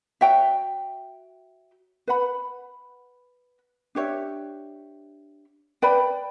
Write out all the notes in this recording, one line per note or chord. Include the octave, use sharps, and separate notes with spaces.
F#4 C#5 E5 G5
B4 F#5 B5
D4 G4 C#5 E5
B4 D5 G5 B5